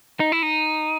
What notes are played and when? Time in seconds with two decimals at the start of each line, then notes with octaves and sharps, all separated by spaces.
0.20 D#4
0.32 E4
0.43 D#4